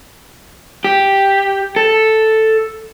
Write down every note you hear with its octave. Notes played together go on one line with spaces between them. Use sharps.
G4
A4